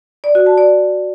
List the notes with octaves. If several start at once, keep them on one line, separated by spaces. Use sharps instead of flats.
D5
F#4
A5
D5